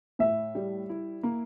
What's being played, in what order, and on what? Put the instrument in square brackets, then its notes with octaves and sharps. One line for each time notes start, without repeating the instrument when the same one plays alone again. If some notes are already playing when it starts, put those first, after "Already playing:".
[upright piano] A2 [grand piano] E5
[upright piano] G3
E4
A#3